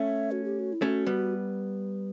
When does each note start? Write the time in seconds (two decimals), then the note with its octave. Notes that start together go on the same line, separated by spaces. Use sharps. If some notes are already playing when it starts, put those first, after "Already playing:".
Already playing: A3 C#4 E5
0.32 F#4
0.44 G4
0.59 F#4
0.73 E4
0.81 A3 C#4 F#4 G4
1.06 G3 B3